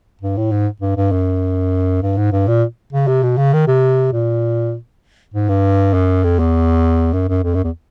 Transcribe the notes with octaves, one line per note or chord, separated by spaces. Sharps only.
G2
A2
G#2
G2
G2
F#2
G2
G#2
G2
A#2
C#3
C3
B2
C#3
D#3
C3
A#2
G#2
G2
F#2
F2
E2
F#2
F#2
F2
F#2
E2